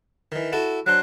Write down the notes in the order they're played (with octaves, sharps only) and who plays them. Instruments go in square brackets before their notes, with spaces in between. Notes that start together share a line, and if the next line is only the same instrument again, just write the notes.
[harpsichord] D#3 E3
E4 F#4 A4
[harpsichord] F#3 D4 C5 [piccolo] F#6